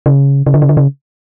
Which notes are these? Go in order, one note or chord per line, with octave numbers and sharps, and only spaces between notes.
C#3
C#3
D3
C#3
D3
C#3